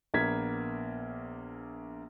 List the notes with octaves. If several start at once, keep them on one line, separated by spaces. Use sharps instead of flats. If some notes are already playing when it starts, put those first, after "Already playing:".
A#1 A#3 B3 G#6 B6